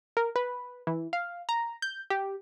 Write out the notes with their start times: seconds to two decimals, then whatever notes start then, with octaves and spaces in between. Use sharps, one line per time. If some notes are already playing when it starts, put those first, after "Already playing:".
0.17 A#4
0.36 B4
0.87 E3
1.13 F5
1.49 A#5
1.82 G6
2.10 G4